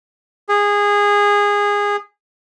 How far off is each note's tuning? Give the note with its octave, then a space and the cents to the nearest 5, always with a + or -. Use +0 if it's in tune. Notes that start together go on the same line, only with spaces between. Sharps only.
G#4 -20